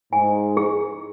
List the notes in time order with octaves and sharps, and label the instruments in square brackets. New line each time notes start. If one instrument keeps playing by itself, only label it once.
[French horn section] G#2 [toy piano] G#5
[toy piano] G#4